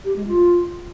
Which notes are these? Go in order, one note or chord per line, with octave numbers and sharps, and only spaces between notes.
G4
G#3
F4